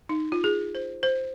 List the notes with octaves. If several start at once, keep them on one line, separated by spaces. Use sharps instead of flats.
D#4
F4
G#4
C5
C5